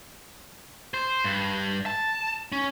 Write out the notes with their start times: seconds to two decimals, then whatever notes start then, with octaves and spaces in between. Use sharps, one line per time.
0.94 C5
1.24 G2
1.86 A5
2.52 C#4